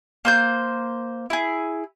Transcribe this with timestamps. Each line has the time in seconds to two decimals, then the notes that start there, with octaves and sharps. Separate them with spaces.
0.25 A#3 C5 G6
1.30 E4 G#4